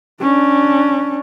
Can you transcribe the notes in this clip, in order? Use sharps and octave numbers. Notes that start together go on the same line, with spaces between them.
C#4 D4